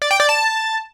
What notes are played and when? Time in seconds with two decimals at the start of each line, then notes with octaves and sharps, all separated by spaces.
0.02 D5
0.11 G5
0.20 D5
0.29 A5